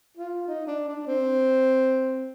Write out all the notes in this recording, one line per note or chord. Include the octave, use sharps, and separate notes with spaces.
F4
D#4
D4
D4
C4